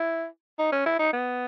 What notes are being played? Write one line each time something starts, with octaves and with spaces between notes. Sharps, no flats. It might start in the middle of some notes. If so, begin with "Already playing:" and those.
Already playing: E4
D#4
C#4
E4
D#4
B3